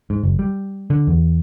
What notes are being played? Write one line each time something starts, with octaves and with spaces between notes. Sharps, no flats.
G#2
F#1
G3
D3
E2